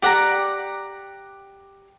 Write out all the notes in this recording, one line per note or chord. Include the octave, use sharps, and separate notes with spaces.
G4 D5 F#5 A#5